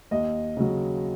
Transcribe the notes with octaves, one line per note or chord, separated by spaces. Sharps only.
D#2 D#5
C#3 F#3